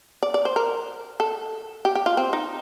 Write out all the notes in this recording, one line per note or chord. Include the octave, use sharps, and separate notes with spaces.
D5
D5
C5
A#4
A4
G4
G4
F4
C4
D#4